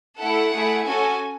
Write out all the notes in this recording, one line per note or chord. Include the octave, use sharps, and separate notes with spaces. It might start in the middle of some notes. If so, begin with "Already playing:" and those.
A3 E4 A4 F#5
A3 E4 G#4
C#4 F#4 A4 G#5